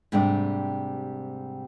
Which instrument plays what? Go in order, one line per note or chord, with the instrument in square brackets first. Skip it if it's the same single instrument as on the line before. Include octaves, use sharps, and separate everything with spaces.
[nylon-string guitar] G#2 C3 G3 A3 D4